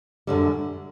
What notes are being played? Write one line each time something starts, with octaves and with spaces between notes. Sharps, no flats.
F#2 D3 G3